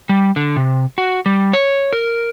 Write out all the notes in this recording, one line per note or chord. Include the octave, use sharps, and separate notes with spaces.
G3
D3
C3
F#4
G3
C#5
A#4